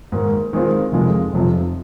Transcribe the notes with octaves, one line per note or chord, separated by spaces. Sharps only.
G#2 D#3 A#3
D#3 G#3 C4 F4
F1 F2 D#3 G#3 F4
F1 F2 C3 F3